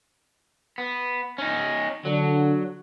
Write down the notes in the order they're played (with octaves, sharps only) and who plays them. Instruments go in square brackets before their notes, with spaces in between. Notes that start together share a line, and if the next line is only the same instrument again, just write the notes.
[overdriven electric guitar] B3
C#4 D#4
[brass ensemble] D3 [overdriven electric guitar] F#3